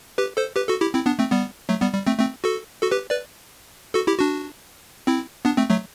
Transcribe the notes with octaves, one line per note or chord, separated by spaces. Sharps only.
G4 B4
A4 C5
G4 B4
F#4 A4
E4 G4
C4 E4
B3 D4
A3 C4
G3 B3
F#3 A3
G3 B3
G3
A3 C4
A3 C4
F#4 A4
F#4 A4
G4 B4
B4 D5
F#4 A4
E4 G4
D4 F#4
C4 E4
B3 D4
A3 C4
F#3 A3